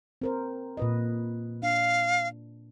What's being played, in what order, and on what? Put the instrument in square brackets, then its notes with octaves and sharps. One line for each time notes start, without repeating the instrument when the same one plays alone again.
[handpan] C4 A#4 C5
A#2 B4 D#5
[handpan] D4 [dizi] F5